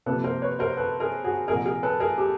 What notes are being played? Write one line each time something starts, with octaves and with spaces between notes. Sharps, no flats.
C3 F3 A#3 A4 B4
A#4 C5
B4 C#5
A#4 C5
A4 B4
G#4 A#4
F#4 G#4
C2 A#2 F3 G#4 A#4
G#4 A#4
A4 B4
G#4 A#4
G4 A4